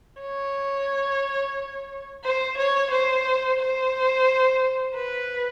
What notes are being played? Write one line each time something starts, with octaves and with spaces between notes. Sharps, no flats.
C#5
C5
C#5
C5
C5
B4